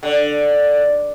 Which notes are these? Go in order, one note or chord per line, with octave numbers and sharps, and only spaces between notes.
D3